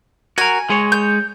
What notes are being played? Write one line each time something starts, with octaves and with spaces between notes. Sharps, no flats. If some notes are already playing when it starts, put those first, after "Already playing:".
F#4 A#4 G#5
G#3 C#5
G6